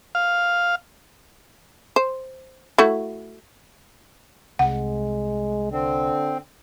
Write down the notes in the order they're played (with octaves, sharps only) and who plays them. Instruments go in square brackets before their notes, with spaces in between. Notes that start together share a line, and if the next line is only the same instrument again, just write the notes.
[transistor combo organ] F5
[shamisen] C5
A3 E4 F#4
[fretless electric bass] C2 [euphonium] G#3 [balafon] F#5
[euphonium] D3 [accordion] C4